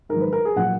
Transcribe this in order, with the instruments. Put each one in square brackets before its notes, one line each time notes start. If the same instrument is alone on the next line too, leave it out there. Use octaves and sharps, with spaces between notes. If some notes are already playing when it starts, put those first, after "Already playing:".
[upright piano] G#2 D#3 F#3 A#4
B4
A#4
G#4
A#2 F#3 F#5